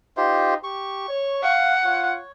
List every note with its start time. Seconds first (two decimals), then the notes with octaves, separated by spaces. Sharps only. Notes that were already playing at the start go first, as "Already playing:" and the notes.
0.17 D#4 F4 G4 C5
0.64 G4 C#6
1.08 C#5
1.43 F5 F#5
1.85 F4 C#5